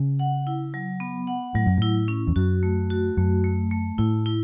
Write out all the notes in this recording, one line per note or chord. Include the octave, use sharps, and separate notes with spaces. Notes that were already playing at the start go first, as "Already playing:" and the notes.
Already playing: C#3
F#5
E4
F#3
B3
F#5
A2 F#3
F#2
A2 E4
C#4
E2
F#2 F#4
A3
F#4
F#2 A3
A3
A3
A2 E4
E4